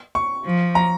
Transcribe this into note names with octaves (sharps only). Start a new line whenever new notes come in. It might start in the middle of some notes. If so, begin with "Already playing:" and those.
C#6
F3
A#5